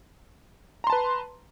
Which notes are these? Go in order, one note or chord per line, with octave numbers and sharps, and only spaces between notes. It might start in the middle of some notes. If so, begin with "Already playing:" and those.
B4 A5 A#5 C6